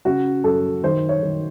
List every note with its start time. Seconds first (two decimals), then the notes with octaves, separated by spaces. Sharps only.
0.05 C#3 F#4
0.44 F#2 A4
0.84 D#3 C5
1.09 C#5
1.23 D#3